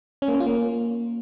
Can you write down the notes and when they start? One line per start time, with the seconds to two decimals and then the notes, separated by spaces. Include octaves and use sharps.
0.22 C#4
0.28 A#3
0.34 C#4
0.40 F4
0.46 A#3